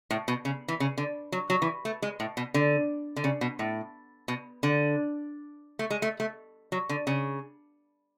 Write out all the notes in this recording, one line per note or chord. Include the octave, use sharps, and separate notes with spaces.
A2
B2
C#3
E3
C#3
D3
F#3
F#3
E3
A3
G#3
A2
B2
D3
D3
C#3
B2
A2
B2
D3
A3
G#3
A3
A3
F#3
D3
C#3